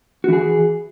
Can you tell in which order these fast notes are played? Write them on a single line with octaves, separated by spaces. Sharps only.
F#4 E3 G#4